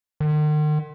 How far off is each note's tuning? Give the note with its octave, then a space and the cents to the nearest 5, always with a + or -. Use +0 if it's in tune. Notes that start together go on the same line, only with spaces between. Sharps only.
D#3 -45